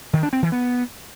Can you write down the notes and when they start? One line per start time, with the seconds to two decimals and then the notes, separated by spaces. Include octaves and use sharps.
0.13 D#3
0.23 D4
0.33 C4
0.42 E3
0.52 B3